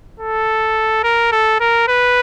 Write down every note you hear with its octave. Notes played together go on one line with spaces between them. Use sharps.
A4
A#4
A4
A#4
B4